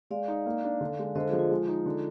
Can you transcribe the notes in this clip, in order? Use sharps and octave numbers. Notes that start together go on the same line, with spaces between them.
G#3 D5 F5
D#4
A#3
D4
D3
G#3
D3 C5 D#5
F4 G#4
F3
F4
G#3
D#4
D3